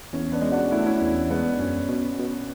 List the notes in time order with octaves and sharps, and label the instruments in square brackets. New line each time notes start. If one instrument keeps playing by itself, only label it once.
[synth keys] E2 [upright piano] C#4
[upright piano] B3 D4
[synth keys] G#3
[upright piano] D4 F#4
[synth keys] A3 [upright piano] E4
[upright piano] D4
C#4 E4
[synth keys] E2
[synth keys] G#3 [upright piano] B3 D4
[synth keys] F#2 [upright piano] C#4
[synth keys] B2
B2